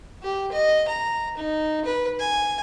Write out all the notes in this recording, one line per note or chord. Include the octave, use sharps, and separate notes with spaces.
G4
D#5
A#5
D#4
B4
G#5